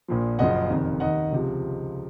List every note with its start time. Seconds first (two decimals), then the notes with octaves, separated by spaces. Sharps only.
0.08 A#1 A#2 F3
0.39 F#1 F#2 C#3 F3 D#5 F#5
0.70 F1 F2 D#3
1.00 D#2 D#3 D#5 F#5
1.32 C#2 C3 F3